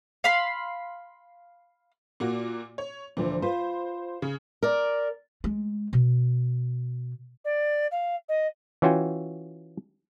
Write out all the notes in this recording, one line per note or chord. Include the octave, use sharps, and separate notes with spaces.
F5 B5 C6
A#2 A#3 F#4
C#5
D2 A#2 E3 F3
F4 B4 C5
C#3
A#4 D5
G#3
B2
D5
F5
D#5
E3 C#4 F4 F#4 G5 G#5